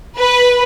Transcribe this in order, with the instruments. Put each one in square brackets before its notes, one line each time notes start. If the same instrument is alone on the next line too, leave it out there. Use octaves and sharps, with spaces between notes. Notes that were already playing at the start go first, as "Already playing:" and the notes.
[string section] B4